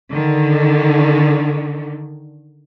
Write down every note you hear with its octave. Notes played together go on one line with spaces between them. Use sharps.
D3 D#3